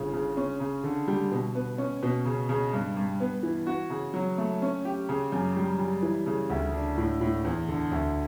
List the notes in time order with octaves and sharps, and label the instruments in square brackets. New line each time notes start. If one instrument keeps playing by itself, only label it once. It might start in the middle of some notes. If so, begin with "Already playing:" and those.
Already playing: [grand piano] G1 C#3
C#3
C#4
C#3
D3
G3
B2
B3
C#4
B2
C#3
C#3
G2
G2
B3
E3
F#4
C#3
F#3
A3
C#4
G4
C#3
F#2
G3
G3
E3
C#3
D2
D4
A2
A2
E2
D3
D2